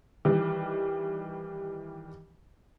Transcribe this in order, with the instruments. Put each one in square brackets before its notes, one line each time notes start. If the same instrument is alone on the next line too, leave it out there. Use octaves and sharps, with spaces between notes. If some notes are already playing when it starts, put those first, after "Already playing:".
[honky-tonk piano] D#3 E3 G3